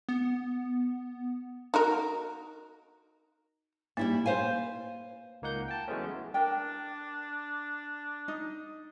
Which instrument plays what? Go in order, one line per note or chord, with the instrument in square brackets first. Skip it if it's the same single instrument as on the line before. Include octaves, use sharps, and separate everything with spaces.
[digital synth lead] B3
[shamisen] D#4 F#4 A#4
[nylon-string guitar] G3 E4 E5 [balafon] A#3
[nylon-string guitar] C5 F5 G#5
[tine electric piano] C#2 A#3 D#4 F#5 G6
G5 A5
E3 F#3 G#3 A3 B3 C#4
[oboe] D4 [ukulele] A#4 G5
[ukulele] D#4